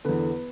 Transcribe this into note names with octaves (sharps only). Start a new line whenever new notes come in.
E2 D3 B3 B4